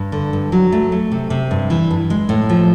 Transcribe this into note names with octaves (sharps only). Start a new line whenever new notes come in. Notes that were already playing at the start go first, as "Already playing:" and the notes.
Already playing: G2
D3
G2
F#3
A3
A3
C3
C3
G2
E3
G2
G#3
A2
F3